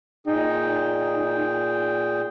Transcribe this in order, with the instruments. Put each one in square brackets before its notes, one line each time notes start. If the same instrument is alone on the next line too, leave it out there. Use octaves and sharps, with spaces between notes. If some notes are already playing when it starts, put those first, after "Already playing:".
[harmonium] A#2 G#4 G5 [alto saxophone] D#4